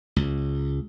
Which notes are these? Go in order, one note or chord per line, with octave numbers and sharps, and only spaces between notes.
C#2